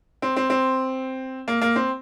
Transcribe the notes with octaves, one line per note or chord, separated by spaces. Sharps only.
C4
C4
C4
A#3
A#3
C4